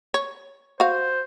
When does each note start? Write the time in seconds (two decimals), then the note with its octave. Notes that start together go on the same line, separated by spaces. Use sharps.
0.14 C#5
0.80 F#4 C5 F5